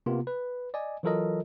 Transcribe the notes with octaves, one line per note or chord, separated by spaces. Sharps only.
C3 A#3 B3 F4
B4
D5 D#5 G#5
E3 F#3 F4 A4 A#4 D#5